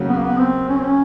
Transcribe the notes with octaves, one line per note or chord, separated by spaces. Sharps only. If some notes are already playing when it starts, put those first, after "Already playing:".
Already playing: D#2 C#3 F#3
B3
A#3
B3
C4
C#4
C4
C#4